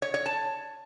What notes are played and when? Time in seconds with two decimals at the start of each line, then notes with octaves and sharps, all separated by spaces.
0.02 C#5
0.14 C#5
0.26 A5